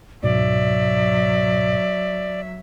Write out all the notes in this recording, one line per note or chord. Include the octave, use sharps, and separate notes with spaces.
C#2 G#2 B2 F#3 D5 E5